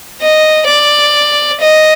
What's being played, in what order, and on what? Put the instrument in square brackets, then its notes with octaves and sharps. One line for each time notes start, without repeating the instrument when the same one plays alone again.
[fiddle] D#5
D5
D#5